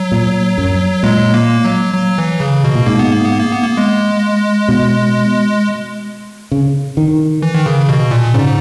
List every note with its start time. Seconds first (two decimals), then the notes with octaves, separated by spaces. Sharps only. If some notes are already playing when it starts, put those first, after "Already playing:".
Already playing: F#3
0.12 A#2
0.58 F#2
1.03 A#2 G#3
1.34 A#3
1.64 F#3
1.94 F#3
2.18 E3
2.40 C#3
2.64 B2
2.75 A#2
2.86 G#2 A#3
2.99 B3
3.12 A#3
3.25 B3
3.39 A#3
3.52 B3
3.64 A#3
3.77 G#3
4.68 B2
6.52 C#3
6.97 D#3
7.42 E3
7.55 D#3
7.66 C#3
7.89 B2
8.11 A#2
8.34 G#2 C#3